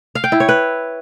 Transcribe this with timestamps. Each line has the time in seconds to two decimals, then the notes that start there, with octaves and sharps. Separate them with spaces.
0.15 F5
0.24 G5
0.32 E4
0.40 C#5
0.49 B4